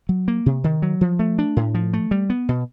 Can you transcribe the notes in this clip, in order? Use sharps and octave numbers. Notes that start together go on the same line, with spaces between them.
F#3
A#3
C3
D#3
F#3
F3
A3
D4
A2
F3
A3
G3
B3
B2